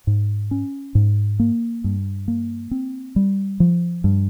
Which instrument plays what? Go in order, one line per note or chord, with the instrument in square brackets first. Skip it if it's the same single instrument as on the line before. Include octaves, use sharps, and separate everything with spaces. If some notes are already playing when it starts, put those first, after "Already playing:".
[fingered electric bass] G#2
C#4
G#2
A#3
G2
A#3
C4
G3
F3
G2